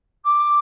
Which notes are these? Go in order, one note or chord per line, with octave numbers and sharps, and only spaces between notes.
D6